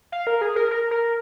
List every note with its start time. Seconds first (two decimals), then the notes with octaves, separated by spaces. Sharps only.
0.12 F5
0.27 A#4
0.41 G#4
0.56 A#4
0.71 A#4
0.91 A#4